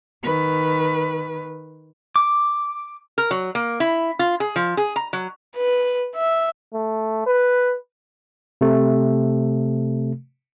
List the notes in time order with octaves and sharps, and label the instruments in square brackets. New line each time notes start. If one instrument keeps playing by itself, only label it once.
[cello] D#3 B4
[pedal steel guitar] D6
[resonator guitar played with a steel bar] A#4
F#3
A#3
E4
F4
G#4
F3
G#4
A#5
F#3
[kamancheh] B4
E5
[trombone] A3
B4
[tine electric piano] C3 A3